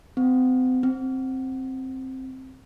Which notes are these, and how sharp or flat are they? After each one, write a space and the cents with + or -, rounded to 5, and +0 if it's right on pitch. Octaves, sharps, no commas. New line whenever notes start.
C4 -40
C4 +5